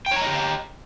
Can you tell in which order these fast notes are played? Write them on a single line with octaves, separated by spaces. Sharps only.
G5 C#5 A#5 D#5 G4